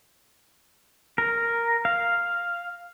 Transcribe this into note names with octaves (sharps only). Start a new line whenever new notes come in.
A#4
F5